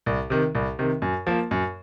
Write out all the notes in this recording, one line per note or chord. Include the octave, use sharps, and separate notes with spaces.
C2
C3 D#3
C2
C3 D#3
F#2
F3 A#3
F#2